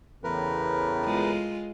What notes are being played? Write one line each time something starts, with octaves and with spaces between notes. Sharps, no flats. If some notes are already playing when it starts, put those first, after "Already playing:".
E2 A2 C#3 A#4 B4
G#3 F4